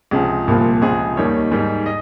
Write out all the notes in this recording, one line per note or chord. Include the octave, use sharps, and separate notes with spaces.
C#2 C3 F3 G#4
C2 A#2 F3
C#2 C3 F3 G#4
D#2 D#3 G3 C#5
G#2 D#3 G3
D#5